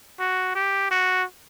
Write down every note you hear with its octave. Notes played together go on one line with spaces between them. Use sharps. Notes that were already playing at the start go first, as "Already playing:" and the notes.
F#4
G4
F#4